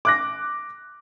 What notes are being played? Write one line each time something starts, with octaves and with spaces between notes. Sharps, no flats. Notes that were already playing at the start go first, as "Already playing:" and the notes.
D6 F#6 A#6